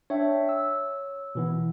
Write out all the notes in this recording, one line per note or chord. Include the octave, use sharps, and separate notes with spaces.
D4 C#5 E5 G5
E6
B2 E3 B3